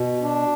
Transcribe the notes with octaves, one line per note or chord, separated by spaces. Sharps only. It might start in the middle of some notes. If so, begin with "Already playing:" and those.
Already playing: B2
D4